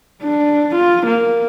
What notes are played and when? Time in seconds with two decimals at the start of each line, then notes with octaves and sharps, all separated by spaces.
0.22 D4
0.75 F4
1.06 A#3